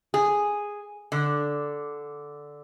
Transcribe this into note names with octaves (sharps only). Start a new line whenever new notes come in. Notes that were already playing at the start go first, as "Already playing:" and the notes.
G#4
D3